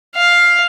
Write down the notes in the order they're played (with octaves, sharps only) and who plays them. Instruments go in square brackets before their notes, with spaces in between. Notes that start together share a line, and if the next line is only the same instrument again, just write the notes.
[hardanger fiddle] F5